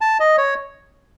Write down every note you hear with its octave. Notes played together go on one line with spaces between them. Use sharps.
A5
D#5
C#5